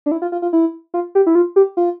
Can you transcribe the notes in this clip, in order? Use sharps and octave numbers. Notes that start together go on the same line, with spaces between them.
D4
E4
F4
F4
F4
E4
F4
G4
E4
F4
G4
F4